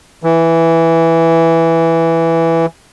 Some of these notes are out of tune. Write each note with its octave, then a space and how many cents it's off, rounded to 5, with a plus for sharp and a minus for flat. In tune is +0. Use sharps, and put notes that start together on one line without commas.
E3 +0